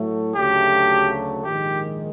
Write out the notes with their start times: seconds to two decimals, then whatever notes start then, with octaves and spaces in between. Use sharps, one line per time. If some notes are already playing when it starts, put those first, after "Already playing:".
Already playing: A2 F#3 A3
0.36 D2 C#3 F#3 A3 G4
1.44 A#1 G#2 D#3 G#3 G4